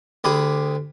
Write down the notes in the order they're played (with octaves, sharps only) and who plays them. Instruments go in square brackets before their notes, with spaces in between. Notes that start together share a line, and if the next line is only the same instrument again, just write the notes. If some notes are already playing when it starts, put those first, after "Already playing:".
[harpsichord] D2 G4 G#4 B5 D6 D#6